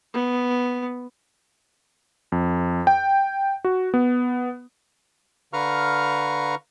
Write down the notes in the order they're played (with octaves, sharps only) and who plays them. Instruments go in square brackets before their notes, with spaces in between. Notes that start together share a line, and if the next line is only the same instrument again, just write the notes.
[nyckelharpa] B3
[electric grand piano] F2
G5
F#4
B3
[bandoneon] D3 B4 F5 A#5 C#6 F6